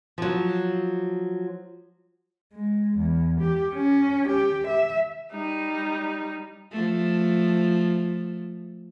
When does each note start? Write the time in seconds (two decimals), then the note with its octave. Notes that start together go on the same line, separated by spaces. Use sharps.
0.18 F3 F#3
2.54 G#3
2.98 E2
3.41 G4
3.74 C#4
4.29 G4
4.68 E5
5.32 G3 D#4
6.71 F3 A3